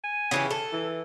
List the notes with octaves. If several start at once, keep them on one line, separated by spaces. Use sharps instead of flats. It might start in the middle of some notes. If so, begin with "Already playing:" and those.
G#5
C#3 E3 G4
A4
E3